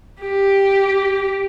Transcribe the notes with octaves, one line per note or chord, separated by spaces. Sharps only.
G4